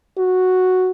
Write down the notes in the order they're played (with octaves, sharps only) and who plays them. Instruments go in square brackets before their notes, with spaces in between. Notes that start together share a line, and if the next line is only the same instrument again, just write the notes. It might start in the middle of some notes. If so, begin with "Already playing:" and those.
[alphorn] F#4